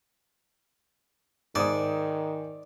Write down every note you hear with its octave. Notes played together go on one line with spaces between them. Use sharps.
G#2 D#3 D5 D#6